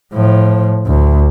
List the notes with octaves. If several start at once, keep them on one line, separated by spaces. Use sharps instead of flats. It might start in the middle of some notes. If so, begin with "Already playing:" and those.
A2 F3
D2